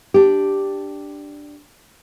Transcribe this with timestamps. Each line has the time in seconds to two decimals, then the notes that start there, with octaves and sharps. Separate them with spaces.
0.14 D4 G4